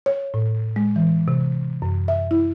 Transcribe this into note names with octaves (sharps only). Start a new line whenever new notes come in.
C#5
A2
G#3
E3
C3
F#2
E5
E4